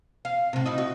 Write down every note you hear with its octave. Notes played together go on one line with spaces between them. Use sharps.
F5
A2 C3
D#4 E4 F#4
F#4